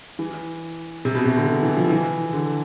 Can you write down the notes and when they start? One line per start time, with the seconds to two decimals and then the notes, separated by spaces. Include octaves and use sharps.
0.19 E3
1.05 C3
1.15 B2
1.26 C3
1.37 D3
1.48 D3
1.62 E3
1.77 F3
1.90 E3
2.33 D3